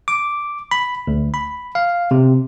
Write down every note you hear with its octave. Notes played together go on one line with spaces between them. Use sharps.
D6
B5
D2
B5
F5
C3